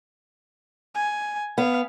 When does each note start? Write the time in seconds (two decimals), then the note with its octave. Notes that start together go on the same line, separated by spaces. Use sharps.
0.95 G#5
1.58 B3 F5